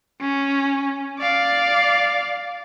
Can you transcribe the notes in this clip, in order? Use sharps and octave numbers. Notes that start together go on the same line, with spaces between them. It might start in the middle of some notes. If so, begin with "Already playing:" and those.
C#4
D5 F5